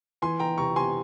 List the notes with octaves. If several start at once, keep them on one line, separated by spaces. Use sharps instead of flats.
E3 G#5 C6
E3 G5 A#5
C3 A#5 C#6
C3 G#5 C6